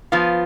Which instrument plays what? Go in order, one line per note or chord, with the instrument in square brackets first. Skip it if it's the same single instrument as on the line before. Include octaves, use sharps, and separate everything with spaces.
[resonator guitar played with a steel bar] F3 B3 F4